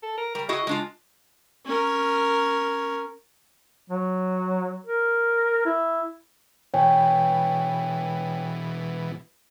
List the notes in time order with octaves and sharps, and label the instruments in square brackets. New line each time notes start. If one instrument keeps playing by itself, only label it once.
[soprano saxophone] A4
A#4
[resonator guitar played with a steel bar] G3 [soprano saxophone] A#4
[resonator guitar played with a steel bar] E4 F#4 G#4 [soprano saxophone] D#5
[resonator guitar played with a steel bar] G#3 D4 F4
[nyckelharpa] C#4 A#4
[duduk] F#3
A#4
E4
[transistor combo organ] B2 E3 [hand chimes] C#5 G5 G#5